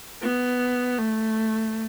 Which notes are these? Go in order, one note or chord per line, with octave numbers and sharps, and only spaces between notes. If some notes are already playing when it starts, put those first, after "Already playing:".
B3
A3